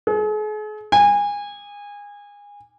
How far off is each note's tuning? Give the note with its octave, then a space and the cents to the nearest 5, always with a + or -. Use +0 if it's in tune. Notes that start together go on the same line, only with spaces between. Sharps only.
G#4 +45
G#5 -25